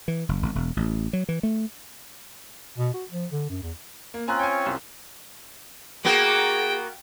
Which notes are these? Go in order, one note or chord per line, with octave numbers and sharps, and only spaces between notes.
E3
F#1
G#1
E1
A1
F#3
E3
A3
B2
F#4
F3
D3
F#2
E2
A#3
C4 C#4 F4 G#5 A#5 F#6
C#5 G5 G#5
C2
A#3 B3 F#4 G#4 G5